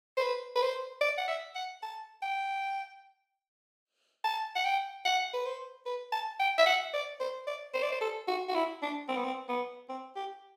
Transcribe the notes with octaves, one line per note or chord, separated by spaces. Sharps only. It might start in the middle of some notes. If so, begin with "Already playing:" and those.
C5
B4
B4
C5
D5
F#5
E5
F#5
A5
G5
A5
F#5
G5
F#5
B4
C5
B4
A5
G5
E5
F#5
D5
C5
D5
C5
D5
C5
A4
F#4
F#4
E4
D4
C4
B3
C4
B3
C4
G4